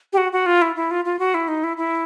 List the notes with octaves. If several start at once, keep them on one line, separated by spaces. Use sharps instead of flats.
G4
F#4
F#4
F4
E4
E4
F4
F4
F#4
E4
D#4
E4
E4